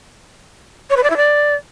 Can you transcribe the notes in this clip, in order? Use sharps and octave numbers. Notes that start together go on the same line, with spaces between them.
C#5
B4
D5
E4
D5